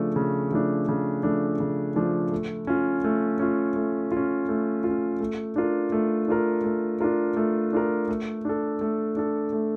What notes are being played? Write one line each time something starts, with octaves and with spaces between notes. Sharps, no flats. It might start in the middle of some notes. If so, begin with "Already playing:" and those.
Already playing: C#3 F3 A3 D4
C#3
F3 A3 D4
C#3
F3 A3 D4
C#3
F3 A3 D4
A3
C#4 F4
A3
C#4 F4
A3
F4
C#4
A3
C#4 F4
A3
D4 F4 A#4
A3
D4 F4 A#4
A3
D4 F4 A#4
A3
D4 F4 A#4
A3
D4 A4
A3
D4 A4
A3